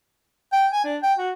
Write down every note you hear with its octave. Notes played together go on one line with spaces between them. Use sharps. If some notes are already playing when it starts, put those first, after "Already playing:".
G5
G#5
D4
G5
F#4